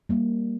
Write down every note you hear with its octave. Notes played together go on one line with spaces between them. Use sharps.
G3 A#3